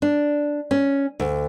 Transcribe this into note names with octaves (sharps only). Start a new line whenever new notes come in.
D4
C#4
D2